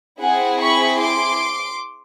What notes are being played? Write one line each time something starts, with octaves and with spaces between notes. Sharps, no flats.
C4 E4 G#4 F#5 G#5
B5 C#6
C6 D6